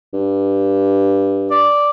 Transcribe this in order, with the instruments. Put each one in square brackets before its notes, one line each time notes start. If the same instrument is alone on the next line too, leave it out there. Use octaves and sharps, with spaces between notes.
[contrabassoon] G2
[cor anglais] D5